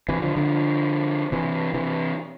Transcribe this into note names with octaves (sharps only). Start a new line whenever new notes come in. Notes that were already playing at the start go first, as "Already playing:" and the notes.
C3 E3
D3 F3
D3 F3
C3 E3
C3 E3